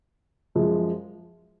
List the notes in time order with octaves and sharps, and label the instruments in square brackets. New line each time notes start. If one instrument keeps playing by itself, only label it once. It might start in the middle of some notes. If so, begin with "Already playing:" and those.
[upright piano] F#2 F3 G#3